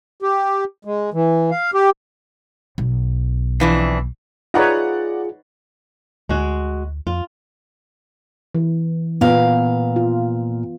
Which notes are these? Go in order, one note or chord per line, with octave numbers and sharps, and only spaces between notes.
G4
G#3
E3
F5
G4
B1
F2 E3 D4
D#4 F4 G#4 B4 C#5 D5 F#5 A#5
D2 G#3 F#4
F2 F4
E3
A#2 B3 F5
F4